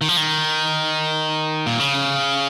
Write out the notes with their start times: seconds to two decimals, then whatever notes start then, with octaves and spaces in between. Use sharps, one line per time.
0.01 D#3
0.09 F3
0.17 D#3
1.66 A#2
1.79 C#3